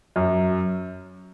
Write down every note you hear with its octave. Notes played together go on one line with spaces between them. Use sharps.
F#2